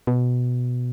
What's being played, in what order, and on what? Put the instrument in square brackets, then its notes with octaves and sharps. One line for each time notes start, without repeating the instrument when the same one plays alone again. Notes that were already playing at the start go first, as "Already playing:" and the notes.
[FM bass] B2